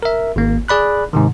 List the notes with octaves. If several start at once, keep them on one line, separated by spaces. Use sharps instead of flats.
A#4 E5
G#1 A#3
G#4 D5 B5 F#6
G#2 C3 D#3